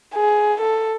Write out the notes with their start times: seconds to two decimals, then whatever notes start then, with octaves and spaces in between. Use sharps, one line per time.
0.14 G#4
0.60 A4